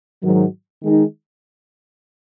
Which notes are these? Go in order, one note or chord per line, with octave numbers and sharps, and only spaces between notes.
G#2 D#3 F#3
D#3 G#3 D#4